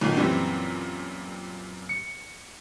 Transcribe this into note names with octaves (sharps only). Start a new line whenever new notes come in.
B1 A#2 D#3
F#2 A#2 E3 G3 C4
C#7